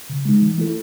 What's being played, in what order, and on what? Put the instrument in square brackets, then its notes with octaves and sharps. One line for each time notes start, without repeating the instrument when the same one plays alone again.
[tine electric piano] C#3
G#3 D#4
E3
A3 E4 A4